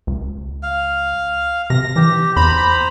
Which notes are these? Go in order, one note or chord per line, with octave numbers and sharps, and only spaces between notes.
C#2
F5
C3 A#6
E3 G4
E2 C5 A#5 B5